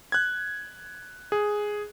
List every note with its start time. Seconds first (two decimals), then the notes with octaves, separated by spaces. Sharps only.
0.12 F#6 G#6
1.32 G#4